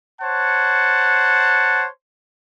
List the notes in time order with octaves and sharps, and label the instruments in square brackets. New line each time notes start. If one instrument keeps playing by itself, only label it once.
[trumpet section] C5 C#5 F#5 A5